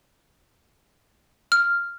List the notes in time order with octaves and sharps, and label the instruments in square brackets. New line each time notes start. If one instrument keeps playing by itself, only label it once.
[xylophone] F6